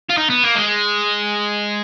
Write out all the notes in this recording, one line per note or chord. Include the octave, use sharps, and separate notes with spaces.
F4
D#4
B3
A#3
G#3